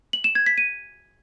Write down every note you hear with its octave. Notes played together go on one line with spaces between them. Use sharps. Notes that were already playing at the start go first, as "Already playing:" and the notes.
F#7
E7
G#6
B6
D#7